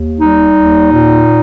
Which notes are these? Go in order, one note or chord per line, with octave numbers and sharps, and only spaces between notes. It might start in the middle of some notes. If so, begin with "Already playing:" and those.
Already playing: D#2
G3 D#4
D#2
A#2